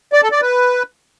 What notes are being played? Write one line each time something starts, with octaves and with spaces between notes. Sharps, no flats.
D5
A4
D5
B4